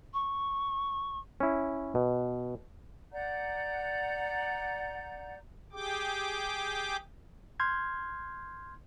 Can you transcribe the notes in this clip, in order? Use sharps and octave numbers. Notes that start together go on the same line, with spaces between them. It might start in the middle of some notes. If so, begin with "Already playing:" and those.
C#6
C#4 E4
B2
D5 F#5 A#5 G6
G4 G#4 G5 D6
C6 F6 G6 G#6